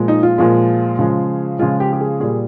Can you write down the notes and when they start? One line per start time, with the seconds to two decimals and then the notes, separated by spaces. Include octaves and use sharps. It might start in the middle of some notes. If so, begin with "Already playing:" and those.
Already playing: A#2 F3 G#3
0.08 D#4
0.23 F4
0.38 A#2 F3 G#3
0.99 C#3 F3 G#3
1.59 C#3 F3 G#3 F4
1.80 G4
1.93 G4
2.01 G#4
2.20 A#2 G3 G#4